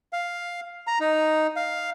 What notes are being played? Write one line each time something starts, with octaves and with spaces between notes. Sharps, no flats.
F5
A#5
D#4
F5